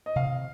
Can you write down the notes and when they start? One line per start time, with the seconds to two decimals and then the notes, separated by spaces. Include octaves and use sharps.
0.06 D#5
0.16 C3 F5